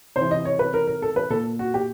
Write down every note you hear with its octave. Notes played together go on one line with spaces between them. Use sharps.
C3 E3 C5
D#5
C#5
B4
A#4
A#4
A4
B4
A#2 A4
F#4
G4